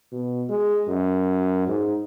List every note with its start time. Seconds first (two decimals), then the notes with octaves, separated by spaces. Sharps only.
0.12 B2
0.49 G#3
0.89 F#2
1.68 G#2